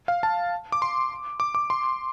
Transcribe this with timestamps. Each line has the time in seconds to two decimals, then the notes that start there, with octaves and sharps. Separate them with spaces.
0.08 F5
0.23 A5
0.72 D6
0.82 C6
1.40 D6
1.55 D6
1.70 C6